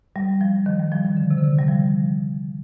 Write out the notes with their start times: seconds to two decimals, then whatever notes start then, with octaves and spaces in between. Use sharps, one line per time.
0.16 G3
0.41 F3
0.66 D#3
0.79 G3
0.92 F3
1.05 D#3
1.17 D3
1.30 C3
1.38 D3
1.43 C3
1.59 G3
1.68 F3